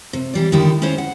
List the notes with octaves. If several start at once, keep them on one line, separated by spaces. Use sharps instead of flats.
C3
E3 G3 D5
D3 D#3 G3 D#4 E4 G4
C#4 E4 F4 C5
F#5